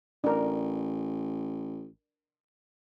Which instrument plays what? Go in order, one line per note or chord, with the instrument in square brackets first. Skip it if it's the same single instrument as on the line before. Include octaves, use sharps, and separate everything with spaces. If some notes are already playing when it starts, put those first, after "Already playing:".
[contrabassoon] A1 [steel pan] D4 A#4